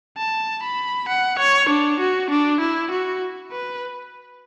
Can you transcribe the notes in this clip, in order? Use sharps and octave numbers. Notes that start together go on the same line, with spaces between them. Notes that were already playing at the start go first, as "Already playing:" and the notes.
A5
B5
F#5
C#5
D4
F#4
D4
E4
F#4
B4